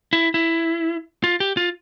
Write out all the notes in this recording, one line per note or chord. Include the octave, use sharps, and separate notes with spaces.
E4
E4
F4
G4
F4